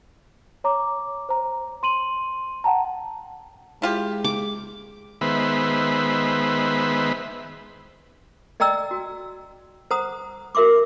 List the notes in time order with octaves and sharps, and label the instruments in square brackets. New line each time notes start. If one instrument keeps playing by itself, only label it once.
[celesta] C#5 A#5 D6
C5 A#5
C6 D#7 F#7
F#5 G5 A5 A#5
[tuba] G#3 [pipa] E4 F4 G4
[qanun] D6
[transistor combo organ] D#3 G#3 B3 C5 E5 B5
[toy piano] D5 D#5 G5 A#5 E6
F#4
C5 F#5 A#5 D#6
F#4 A#4 E5 C6 D6